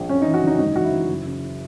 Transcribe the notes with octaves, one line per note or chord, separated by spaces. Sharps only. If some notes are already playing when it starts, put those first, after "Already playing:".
Already playing: A#1
F#2 C#4
D#4
E3
F#4
F#1
D#4
G#1 D#4
E3 F#4
E4
E3
F#1
C#3